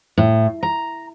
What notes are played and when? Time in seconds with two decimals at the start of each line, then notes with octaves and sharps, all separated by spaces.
0.18 A2
0.63 A#5